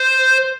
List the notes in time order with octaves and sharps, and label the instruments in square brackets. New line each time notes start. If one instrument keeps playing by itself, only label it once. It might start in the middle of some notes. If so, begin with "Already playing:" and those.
Already playing: [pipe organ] C5